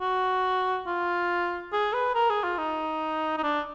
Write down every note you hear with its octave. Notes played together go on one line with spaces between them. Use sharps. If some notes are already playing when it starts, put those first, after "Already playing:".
F#4
F4
G#4
B4
A#4
G#4
F4
D#4
D#4
D4